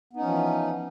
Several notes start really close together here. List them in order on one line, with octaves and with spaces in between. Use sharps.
B3 D#4 C#4 F3 E3